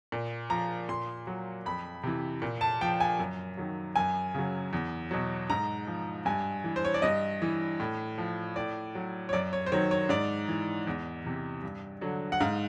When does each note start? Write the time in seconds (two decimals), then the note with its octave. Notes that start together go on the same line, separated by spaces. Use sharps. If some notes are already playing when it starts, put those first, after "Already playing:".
0.12 A#2
0.50 F3 A#5
0.89 A#2 C6
1.27 F#3
1.65 F2 B5
2.03 C3 E3
2.42 A#2
2.61 A5
2.81 F3 G5
3.00 G#5
3.19 F#2
3.57 D#3 F#3
3.96 F#2 G#5
4.34 C#3 F#3
4.73 E2
5.11 B2 F#3
5.49 G#2 A#5
5.87 F3
6.25 G2 G#5
6.64 E3
6.76 C5
6.85 C#5
6.94 D5
7.02 G2 D#5
7.42 E3
7.80 A2
8.18 F3
8.56 A2 D5
8.95 F#3
9.29 C#5
9.33 F#2 D5
9.53 C#5
9.66 C5
9.72 D#3 F#3 C#5
9.91 C#5
10.09 G#2 D5
10.48 E3
10.87 E2
11.24 C3 E3
11.63 G2
12.01 D3 F#3
12.32 F#5
12.40 G#2 F5